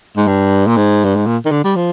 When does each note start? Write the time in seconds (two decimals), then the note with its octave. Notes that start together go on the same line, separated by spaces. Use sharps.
0.17 G#2
0.27 G2
0.67 A#2
0.77 G#2
1.04 G2
1.16 G#2
1.26 A#2
1.45 D#3
1.51 D3
1.64 G3
1.76 F3